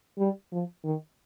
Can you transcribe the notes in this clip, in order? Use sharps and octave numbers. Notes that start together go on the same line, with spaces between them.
G3
F3
D#3